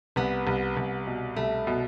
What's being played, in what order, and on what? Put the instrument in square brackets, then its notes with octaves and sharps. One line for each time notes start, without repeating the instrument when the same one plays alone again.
[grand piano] C2 [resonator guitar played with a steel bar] B3
[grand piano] C2
C2
B2
[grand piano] C2 [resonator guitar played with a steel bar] A3
[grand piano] B2